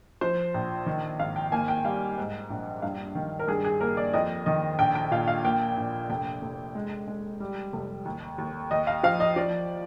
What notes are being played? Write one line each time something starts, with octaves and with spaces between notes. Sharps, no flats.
F3 C5
A#1
D#3
G#1 F5
G5
A#3 G#5
G5
G3 F5
G#2
A#1
G2 F5
D#3
A#4
G2 G#4
G#4
A#3 A#4
D5
F2 D#5
D#3 D#5
A#1 G5
G5
A#2 F5
F5
A#3 G5
A#1
F1 G5
F1
G#3
G#3
G3
F1
D#2
D#2
D#2 D#5
F5
F3 F5
D#5
F3 D5